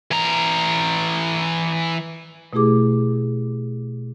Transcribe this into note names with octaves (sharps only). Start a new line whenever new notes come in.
E3 A#5
B2 A3 E4 G4 G#4 D6